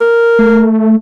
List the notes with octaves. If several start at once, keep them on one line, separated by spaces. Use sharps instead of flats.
A#4
A3